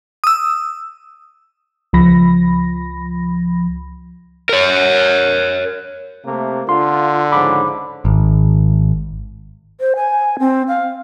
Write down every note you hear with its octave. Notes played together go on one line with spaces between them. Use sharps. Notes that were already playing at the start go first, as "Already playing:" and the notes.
D#6 E6
C#2 F3 B5 A#6
A#4 C#5
C3 A3 A#3
D3 F4 C6
G#2 C#3 F3 B5 D6
G#1
C5
G#5
C4
F5